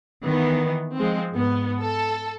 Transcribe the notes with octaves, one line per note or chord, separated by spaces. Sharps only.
D#3 E3 B3
F3 G#3 C4
G#2 B3
A4